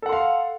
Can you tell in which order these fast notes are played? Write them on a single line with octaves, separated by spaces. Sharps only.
A4 F#5 C6 F5